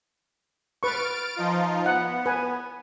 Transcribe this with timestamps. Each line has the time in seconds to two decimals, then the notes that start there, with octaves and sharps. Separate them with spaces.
0.83 B4 C#6 F6 A6 D7
1.36 F3 D#4 F4
1.86 B3 F#5
2.26 B4 G#5